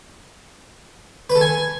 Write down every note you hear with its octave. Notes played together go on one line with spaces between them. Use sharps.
B4
A4
G#5